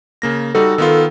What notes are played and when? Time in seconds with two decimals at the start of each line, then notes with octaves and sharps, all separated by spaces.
0.22 C#3 A#3 A#6
0.55 G3 D#4 F#4 A4
0.78 D#3 B3 F4